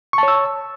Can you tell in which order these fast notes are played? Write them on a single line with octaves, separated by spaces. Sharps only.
C#6 A5 C#5 E6